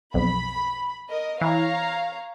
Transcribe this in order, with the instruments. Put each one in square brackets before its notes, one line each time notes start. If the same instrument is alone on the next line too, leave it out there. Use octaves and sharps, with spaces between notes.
[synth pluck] B1 F2 [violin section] B5
[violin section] A#4 D#5
[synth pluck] E3 [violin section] C#5 F5 A#5